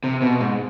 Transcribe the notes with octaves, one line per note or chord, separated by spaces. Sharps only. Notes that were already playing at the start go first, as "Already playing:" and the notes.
C3
B2
G#2